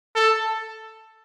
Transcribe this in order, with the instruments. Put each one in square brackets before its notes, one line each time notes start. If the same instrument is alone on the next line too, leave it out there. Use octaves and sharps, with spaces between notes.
[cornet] A4